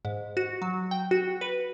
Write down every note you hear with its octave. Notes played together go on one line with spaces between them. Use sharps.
G#2
F#4
F#3
G5
F#4
B4